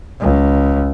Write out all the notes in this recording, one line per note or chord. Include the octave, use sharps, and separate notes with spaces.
C#2